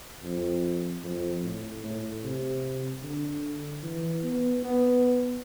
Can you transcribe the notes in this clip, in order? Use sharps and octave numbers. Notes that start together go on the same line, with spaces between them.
F2
F2
A2
A2
C3
D3
E3
B3
B3